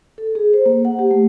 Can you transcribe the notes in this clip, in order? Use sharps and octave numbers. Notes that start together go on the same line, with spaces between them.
A4
G#4
C5
A#3
F#5
G4
A3